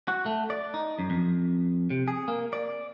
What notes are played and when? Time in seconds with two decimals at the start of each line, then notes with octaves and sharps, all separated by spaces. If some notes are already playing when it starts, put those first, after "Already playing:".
0.08 F#4
0.26 A3
0.50 D5
0.74 D#4
0.99 F#2
1.10 F2
1.90 C3
2.08 G#4
2.28 A#3
2.53 D5